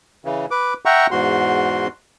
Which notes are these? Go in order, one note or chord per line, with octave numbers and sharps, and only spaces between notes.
C#3 E3
B4 D6
E5 F#5 G5 A#5 C#6
E2 G#2 F#4 C6